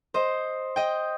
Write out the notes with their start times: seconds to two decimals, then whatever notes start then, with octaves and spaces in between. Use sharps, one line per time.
0.14 C5 D#5
0.76 D#5 G5